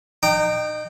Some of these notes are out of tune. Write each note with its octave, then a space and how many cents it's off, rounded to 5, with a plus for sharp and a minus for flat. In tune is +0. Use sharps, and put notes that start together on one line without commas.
D#4 -30 G5 +0